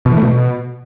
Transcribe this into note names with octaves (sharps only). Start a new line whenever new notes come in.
B2
E3
A3
B2